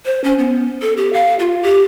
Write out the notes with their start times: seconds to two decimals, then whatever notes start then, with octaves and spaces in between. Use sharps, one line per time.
0.05 C5
0.24 C#4
0.39 B3
0.82 A4
0.97 G4
1.13 F5
1.39 F4
1.63 G4